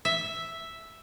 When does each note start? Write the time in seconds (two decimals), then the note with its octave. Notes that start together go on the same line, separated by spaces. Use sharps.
0.05 E5